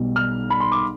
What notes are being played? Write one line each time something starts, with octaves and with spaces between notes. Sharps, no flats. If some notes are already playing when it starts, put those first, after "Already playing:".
Already playing: B1 B2 G3
F6
B5
C6
D6